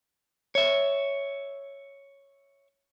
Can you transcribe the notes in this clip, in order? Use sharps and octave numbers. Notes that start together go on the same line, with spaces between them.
C#5 E5